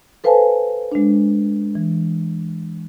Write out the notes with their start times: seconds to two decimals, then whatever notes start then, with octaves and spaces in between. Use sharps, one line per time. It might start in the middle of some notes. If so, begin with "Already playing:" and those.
0.24 A4 B4 C5 F5 G#5 A5
0.92 G#3 D4
1.75 E3